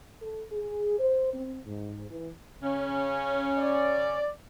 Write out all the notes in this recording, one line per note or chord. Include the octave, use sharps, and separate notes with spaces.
A4
G#4
C5
C4
G#2
E3
C#3 C#4
D5